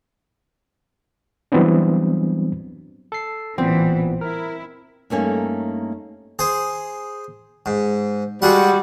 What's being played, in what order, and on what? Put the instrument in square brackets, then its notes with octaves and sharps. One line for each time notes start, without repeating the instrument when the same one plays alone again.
[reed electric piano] E3 F#3 G3 B3 C4 D4
[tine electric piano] A4 C7
[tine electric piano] A1 A#2 B3 [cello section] E3 [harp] C4
[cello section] E4 [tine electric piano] A#4
[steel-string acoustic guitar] G2 A3 A#3 C#4 D#4
[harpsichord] G#4 C5
G#2
[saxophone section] G3 F#4 [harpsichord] G#3 F4 F#5